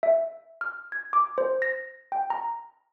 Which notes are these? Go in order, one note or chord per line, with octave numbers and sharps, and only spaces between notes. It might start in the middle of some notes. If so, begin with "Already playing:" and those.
E5
F6
G#6
D6
C5
A#6
G5
A#5